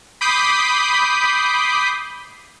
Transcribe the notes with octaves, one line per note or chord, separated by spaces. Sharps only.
B5 D6 D#6 G6 B6 C7